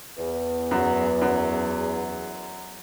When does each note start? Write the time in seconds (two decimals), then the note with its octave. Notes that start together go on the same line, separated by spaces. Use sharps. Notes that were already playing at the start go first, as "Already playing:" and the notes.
0.18 E2
0.71 F#2 F#4
1.21 F#2